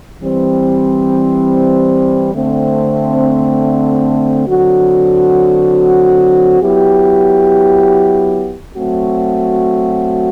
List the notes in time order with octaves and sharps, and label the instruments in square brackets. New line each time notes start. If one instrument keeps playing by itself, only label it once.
[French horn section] E3 G3 C4
D3 A3 C4
D3 F#3 C4 F#4
F#3 B3 E4 G4
F#3 A3 C4 F#4